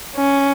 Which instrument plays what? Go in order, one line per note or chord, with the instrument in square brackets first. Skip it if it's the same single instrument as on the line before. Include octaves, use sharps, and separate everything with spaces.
[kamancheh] C#4